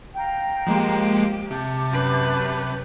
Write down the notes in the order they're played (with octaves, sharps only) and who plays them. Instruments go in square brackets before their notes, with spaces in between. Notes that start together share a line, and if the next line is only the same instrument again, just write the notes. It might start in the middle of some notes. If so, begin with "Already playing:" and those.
[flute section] F5 G5 A#5
[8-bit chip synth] F3 G#3 A#3 [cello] G4
[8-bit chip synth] C3 [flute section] A5 D6 G6
[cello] F#2 B4